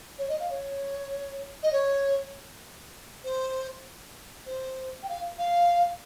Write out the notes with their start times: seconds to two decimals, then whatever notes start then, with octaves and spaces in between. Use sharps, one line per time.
0.18 C#5
0.29 D#5
0.40 F5
0.50 C#5
1.63 D#5
1.72 C#5
3.24 C5
4.46 C5
5.02 G5
5.09 F5
5.38 F5